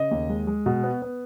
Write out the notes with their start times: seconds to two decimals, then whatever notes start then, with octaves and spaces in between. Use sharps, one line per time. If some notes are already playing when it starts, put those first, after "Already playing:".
Already playing: C#3 D#5
0.11 D#2
0.30 G#3
0.47 G#3
0.66 B2
0.84 B3
1.02 B3